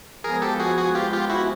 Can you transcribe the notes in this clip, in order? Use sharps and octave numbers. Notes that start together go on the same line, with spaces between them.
F3 G#3 B3 G#4 A#4
G4 A4
F#4 G#4
F#4 G#4
F4 G4
F4 G4
E4 F#4